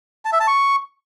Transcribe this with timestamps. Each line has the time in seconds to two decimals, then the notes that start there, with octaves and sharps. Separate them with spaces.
0.25 A5
0.32 E5
0.40 A5
0.47 C#6